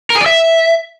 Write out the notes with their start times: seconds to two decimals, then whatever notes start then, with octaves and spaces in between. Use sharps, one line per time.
0.10 A#4
0.16 G#4
0.21 D5
0.26 E5